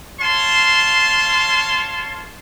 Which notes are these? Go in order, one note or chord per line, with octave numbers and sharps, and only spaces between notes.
C#5 F5 A5 C6